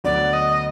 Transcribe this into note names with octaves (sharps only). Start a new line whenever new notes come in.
D2 D3 F#3 B3 D5
D#5